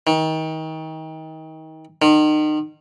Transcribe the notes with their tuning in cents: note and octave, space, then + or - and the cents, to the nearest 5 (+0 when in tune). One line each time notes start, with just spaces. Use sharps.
D#3 +30
D#3 -35